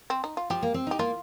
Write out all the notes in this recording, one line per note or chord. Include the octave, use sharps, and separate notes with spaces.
C4
D#4
F4
F3 G4
A#3
C4
D#4 G4
A#3 F4